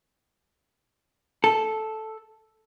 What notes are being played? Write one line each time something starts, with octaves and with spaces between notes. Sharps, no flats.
A4